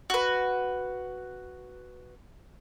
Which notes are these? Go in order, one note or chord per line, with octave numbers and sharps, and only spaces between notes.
F#4 B4